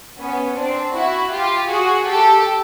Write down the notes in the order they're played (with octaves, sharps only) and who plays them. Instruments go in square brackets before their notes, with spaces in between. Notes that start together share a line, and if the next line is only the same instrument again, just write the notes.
[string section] B3 C#4
C4 D4
E4 F#4
F4 G4
F#4 G#4
G4 A4